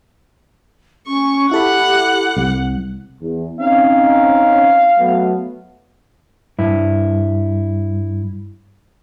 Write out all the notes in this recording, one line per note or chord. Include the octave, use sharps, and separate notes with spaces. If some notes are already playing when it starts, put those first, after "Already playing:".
C#4 C#6
E4 G4 A4 F#5 B5
C2
E2
C4 C#4 D#4 F5
F#3 A3 B3
G2 E4